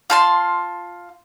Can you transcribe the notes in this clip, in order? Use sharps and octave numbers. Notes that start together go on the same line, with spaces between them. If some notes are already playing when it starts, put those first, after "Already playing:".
F4 A5 C6